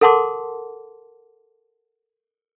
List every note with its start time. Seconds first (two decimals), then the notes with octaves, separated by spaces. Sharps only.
0.01 A4 A#4 F#5 A5 C6 D6